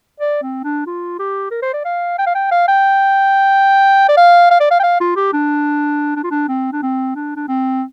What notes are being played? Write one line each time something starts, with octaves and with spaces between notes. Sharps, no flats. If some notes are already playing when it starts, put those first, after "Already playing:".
D5
C4
D4
F4
G4
A#4
C5
D5
F5
G5
F5
G5
F5
G5
D5
F5
F5
D5
F5
G5
F5
F4
G4
D4
D4
F4
D4
C4
D4
C4
D4
D4
C4